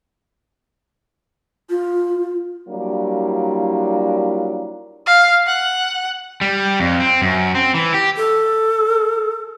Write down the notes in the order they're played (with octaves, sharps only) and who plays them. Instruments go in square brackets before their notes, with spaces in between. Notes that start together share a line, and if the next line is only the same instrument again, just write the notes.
[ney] F4
[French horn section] F#3 G3 A#3 D4 E4 F4
[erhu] F5
F#5
[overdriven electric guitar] G3
F2
C4
F#2
C4
E3
G4
[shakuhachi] A4